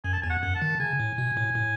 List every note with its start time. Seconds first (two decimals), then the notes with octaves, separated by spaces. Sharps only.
0.04 F#2 G#5
0.13 A5
0.22 E2 G#5
0.30 F#5
0.43 F#2
0.55 A5
0.62 D#3
0.80 C#3 G#5
0.99 A2
1.18 B2
1.37 A2
1.55 A2